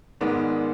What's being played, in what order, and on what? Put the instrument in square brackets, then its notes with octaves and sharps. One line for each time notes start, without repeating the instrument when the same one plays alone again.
[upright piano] G#2 D#3 G#3 B3 D5